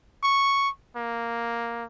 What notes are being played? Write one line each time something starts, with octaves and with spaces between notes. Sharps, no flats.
C#6
A#3